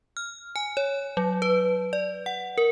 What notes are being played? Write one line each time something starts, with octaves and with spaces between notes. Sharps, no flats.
F6
G#5
C#5
F#3
B4
D5
F#5
A#4